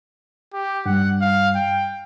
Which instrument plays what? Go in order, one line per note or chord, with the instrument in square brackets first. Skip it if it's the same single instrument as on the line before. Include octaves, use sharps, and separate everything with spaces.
[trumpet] G4
[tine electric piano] G2 G3 [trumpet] F#5
[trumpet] F5
G5